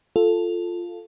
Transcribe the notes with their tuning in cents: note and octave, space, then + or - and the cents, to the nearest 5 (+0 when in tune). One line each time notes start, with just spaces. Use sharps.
F4 +0 A4 +0